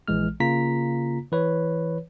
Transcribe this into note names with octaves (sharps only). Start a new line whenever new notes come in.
A#1 E3 G#3 F6
C#3 A#3 F4 A#5 B6
E3 B4 C#5